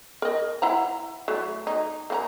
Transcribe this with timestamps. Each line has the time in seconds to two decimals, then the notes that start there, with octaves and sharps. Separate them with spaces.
0.22 A#4 D#5
0.62 E4 F#5 A#5
1.28 E3 F#3 A3
1.67 D#4
2.10 A#3 F#4 A#5